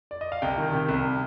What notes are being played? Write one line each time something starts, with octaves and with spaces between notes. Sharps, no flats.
D5
D#5
F5
C2 G5
D#3
C3
C2